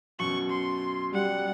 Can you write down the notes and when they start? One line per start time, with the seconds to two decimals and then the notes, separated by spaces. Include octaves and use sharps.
0.19 F#2 B2 C#6 F#7
0.50 C6
1.14 G3 F#5